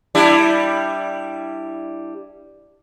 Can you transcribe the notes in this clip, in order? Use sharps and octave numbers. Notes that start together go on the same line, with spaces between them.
G3 D4 E4